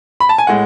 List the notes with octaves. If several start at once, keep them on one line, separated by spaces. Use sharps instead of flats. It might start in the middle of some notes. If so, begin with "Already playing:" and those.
B5
A5
G#5
A2 G#3 F#5